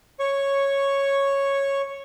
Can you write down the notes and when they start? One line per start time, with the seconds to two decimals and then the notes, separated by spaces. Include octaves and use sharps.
0.19 C#5 C#6